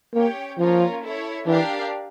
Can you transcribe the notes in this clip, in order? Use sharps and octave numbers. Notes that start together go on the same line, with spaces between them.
A#3 C#4 G4 C#5 G5
F3 A#3 C#4 F4 A#4 C#5
E4 A4 C#5
E3 D4 G4 A#4 D5 F5